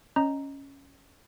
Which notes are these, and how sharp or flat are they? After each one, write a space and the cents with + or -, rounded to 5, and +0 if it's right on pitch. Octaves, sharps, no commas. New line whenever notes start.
C#4 +0 D#5 +0 A#5 +0